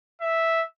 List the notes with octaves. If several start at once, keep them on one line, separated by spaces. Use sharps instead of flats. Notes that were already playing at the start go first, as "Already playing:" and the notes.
E5